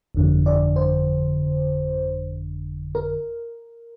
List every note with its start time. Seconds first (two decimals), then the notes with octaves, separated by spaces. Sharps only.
0.15 G1 F2 D3
0.46 D5
0.76 C5
2.95 A#4